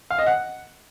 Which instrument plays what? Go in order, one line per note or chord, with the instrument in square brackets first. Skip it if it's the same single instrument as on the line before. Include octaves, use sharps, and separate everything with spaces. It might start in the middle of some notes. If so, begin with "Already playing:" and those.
[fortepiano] F5
D#5
F#5